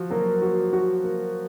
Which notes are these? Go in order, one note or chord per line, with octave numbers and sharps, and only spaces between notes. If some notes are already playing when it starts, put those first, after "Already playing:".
Already playing: F3 F#4
F#3 A#3
F#4
F#4
A#3